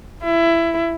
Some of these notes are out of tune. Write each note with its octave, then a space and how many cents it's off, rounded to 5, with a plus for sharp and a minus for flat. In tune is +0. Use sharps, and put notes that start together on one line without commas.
E4 +20